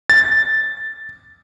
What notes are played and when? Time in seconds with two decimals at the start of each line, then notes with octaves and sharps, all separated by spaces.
0.10 A6